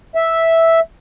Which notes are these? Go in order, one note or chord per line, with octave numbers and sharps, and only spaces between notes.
E5